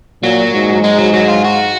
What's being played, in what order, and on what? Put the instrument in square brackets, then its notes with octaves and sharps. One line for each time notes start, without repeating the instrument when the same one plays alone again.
[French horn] A#2 [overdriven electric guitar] F#3
[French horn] G#2
[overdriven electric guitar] G#3
F#3
F#3
F4
F#4